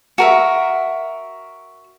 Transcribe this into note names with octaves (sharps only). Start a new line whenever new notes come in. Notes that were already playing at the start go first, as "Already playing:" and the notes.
F#4 A#4 E5